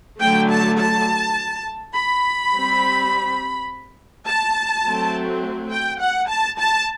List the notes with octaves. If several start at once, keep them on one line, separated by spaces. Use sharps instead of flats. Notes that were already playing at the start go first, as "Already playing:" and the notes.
D3 F#3 A3 G5
A5
A5
B5
G3 C4
A5
F#3 A3 C4
G5
F#5
A5
A5